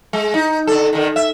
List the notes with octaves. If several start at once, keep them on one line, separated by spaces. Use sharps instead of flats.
G#3
D#4
D3 A4
D3 D#3
E5